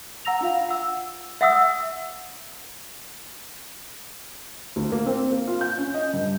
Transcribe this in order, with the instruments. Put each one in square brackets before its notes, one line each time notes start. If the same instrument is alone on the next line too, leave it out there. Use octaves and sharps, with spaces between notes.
[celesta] F#5 A#5 E6 A#6 F7
D4 F4 F5
F#5 E6
[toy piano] E5 F#5 D#6 E6
[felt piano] D2
A#3
C4
A#3
F4
G6
C#4
D#5
G2